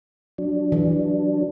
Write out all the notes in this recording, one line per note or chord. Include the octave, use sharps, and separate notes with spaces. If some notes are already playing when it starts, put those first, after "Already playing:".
F#3 D4
E3